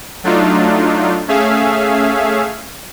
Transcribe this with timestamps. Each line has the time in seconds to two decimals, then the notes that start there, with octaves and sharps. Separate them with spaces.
0.24 F#3 A3 D4 D#4 F4
1.28 A3 C#4 G#4 E5 F5